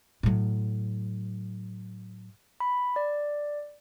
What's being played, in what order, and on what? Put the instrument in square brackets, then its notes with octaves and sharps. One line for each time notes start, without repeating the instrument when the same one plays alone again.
[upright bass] A2 F#3
[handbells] B5
D5